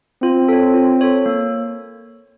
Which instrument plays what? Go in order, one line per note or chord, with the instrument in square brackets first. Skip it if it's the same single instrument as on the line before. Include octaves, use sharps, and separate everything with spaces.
[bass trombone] C4 [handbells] F4
[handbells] A4 C#5
F4
A4 C#5
A#3